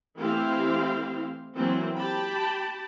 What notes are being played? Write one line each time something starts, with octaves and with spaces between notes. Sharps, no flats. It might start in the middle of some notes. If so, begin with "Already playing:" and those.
E3 A3 C4 E4 G4 F5
E3 F#3 A#3 C4
G4 G5 A5 B5